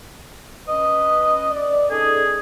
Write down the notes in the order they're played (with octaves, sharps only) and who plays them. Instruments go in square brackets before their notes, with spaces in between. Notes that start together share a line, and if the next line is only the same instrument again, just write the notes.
[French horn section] C#4 B4 [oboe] D#5
[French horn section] D5
[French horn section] C#4 D#4 A4 [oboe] G#4